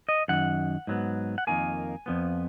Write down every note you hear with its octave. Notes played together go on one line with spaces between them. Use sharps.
D#5
F#2 D#3 F#5
G#2 F#3 B3
F#5
F2 D#3 A#3 G#5
F2 F3 B3